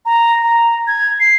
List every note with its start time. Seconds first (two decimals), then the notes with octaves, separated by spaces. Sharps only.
0.06 A#5
0.43 A#5
0.87 G#6
1.20 C7